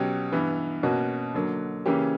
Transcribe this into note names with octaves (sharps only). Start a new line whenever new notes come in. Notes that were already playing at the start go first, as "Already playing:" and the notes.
Already playing: B2 F#3 C#4 G4
G2 E3 B3
B2 A#3 C#4 F#4
D3 F#3 A#3
C#3 E3 A#3 C#4 G4